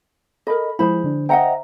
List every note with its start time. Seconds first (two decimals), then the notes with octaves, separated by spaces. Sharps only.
0.47 A4 A#4 D#5 B5
0.79 F3 G#3 E4 G#4 C5 B5
1.04 D3 D4
1.29 C5 D#5 E5 F#5 G5 A#5